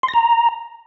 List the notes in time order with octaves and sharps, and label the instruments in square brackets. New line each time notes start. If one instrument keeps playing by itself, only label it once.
[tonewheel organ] C6
A#6
A#5